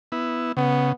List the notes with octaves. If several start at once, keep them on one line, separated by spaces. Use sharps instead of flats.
B3 E4
C#3 B3